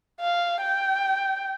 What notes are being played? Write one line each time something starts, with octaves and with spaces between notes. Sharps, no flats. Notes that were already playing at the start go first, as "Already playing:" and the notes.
F5
G5